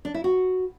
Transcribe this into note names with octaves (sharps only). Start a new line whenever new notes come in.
D4
E4
F#4